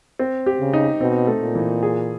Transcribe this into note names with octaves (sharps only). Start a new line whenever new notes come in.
C4
G4
C#3
D#4
B2 C4
A3
A#2
E3
G#4